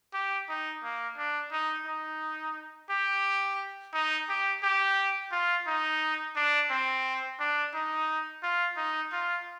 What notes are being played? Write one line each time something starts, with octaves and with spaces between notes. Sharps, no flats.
G4
D#4
A#3
D4
D#4
D#4
G4
D#4
G4
G4
F4
D#4
D4
C4
D4
D#4
F4
D#4
F4